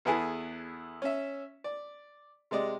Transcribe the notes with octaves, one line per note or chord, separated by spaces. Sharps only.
E2 B3 E4 G#4 A4 G#5
C#4 E5
D5
C3 G#3 D5 D#5